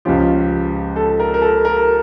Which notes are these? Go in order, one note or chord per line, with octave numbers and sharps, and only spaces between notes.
C#2 C#3 F3 C#4 F4 G4
A4
A#4
A#4
A4
A#4